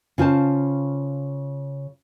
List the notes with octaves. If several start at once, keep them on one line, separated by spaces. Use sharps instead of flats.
C#3 F4 C5 A5